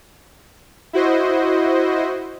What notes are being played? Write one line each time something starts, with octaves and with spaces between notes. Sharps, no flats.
E4 F#4 C5 D#5